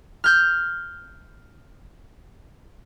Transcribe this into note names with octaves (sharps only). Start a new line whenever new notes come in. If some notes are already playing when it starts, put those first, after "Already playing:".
F6 G6